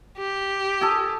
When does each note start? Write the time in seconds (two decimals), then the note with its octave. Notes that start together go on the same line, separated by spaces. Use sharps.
0.18 G4
0.81 G#4 A4